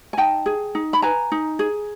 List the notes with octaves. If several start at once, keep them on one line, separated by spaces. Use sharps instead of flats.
G#5
D#4 G5 A5
G#4
D#4
B5
B4 G#5 A#5
D#4
G#4